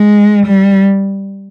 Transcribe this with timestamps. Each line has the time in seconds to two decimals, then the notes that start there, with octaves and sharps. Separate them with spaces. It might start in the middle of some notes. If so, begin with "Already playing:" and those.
Already playing: G#3
0.46 G3